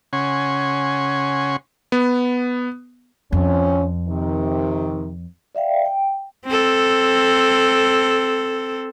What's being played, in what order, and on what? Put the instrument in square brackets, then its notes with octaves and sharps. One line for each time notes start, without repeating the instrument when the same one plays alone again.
[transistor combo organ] C#3 C#4 F#5 G#5 C6 C#6
[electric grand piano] B3
[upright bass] F2 [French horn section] F3 C4 C#4
[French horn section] C3 D#3
[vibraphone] D5 E5 F5 G5
G5
[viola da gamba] C4 A4